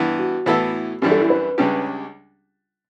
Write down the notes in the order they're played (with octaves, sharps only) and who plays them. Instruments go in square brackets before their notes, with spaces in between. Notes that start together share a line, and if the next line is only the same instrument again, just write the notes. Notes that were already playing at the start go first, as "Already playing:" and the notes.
Already playing: [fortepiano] G2 E3 B3
[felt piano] F#4
[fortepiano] A2 E3 B3 E4 A4
[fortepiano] F#2 E3 G3 D4 [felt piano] G4
[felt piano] A4
E4
B4
[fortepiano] C#2 C#3 G3 D4 G4